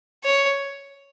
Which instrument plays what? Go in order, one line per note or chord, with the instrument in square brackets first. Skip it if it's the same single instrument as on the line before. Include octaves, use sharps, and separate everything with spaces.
[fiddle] C#5